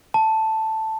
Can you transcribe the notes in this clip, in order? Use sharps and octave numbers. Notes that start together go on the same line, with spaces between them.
A5